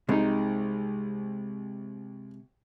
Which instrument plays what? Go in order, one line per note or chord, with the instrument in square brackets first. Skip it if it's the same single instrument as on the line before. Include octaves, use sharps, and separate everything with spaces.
[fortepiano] C2 D#4 [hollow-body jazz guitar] C3 G#3